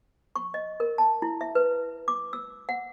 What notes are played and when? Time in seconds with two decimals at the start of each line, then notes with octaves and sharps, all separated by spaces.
0.36 C#6
0.54 D#5
0.80 A#4
0.98 A5
1.22 E4
1.41 E5
1.55 B4
2.08 D6
2.33 E6
2.69 F#5